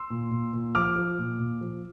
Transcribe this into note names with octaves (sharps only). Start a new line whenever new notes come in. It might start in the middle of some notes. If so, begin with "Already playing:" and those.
Already playing: C6 E6
A#2
A#2
A#2
F3 D6 F6
F3
A#2
A#2
F3